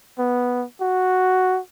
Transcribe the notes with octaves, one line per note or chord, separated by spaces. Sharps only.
B3
F#4